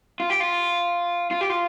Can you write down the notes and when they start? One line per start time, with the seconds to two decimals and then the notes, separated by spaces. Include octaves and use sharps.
0.20 F4
0.30 G4
0.40 F4
1.31 F4
1.41 G4
1.50 F4